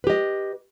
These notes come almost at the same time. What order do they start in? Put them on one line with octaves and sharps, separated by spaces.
B4 G4 D#5